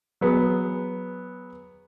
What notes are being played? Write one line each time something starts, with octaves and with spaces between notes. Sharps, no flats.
F#3 B3 G#4